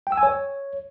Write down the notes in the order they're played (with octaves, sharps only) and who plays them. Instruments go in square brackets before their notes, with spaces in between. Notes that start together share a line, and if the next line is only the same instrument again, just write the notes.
[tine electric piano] G5
E6
G#5
C#5